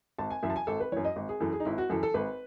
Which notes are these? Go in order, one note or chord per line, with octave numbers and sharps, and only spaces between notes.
G#1 A5
G#5
F#2 E3 E5
A5
G#5
G#1 A4
B4
F#2 E3 C#5
D#5
G#1
G#4
F#2 E3 A4
G#4
D#4
G#1 E4
F#4
F#2 E3 A4
A4
G#1 B4